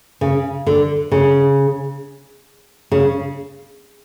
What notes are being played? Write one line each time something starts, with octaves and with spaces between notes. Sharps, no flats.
C#3
D3
C#3
C#3